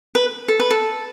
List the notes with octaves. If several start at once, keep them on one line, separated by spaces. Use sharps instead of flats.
B4
A4
B4
A4